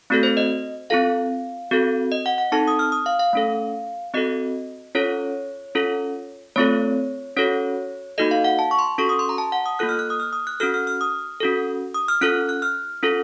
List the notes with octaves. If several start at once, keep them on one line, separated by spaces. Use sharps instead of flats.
A3 C4 F#4 A4
C5
D#5
C4 F4 A4 F5
C4 F#4 A4
D#5
F#5
F#5
C4 D#4 A4 A5
D#6
F6
D#6
F5
F5
A3 C#4 A4
C4 F#4 A4 D#5
C#4 F4 A4 C#5
C#4 F4 A4
A3 C4 F4 A4 C#5
C#4 F#4 A4 C#5
A#3 D#4 F#4 A4 D#5
F5
F#5
A5
C#6
C6
C#4 F#4 A4 C#6
D#6
C6
A#5
A5
F#5
D#6
A#3 F4 A4 F#6
F6
F#6
D#6
F6
D#6
F#6
C#4 F#4 A4 F6
F6
F6
D#6
C#4 F#4 A4
D#6
F6
C#4 F4 A4 F#6
F#6
F6
C#4 F4 A4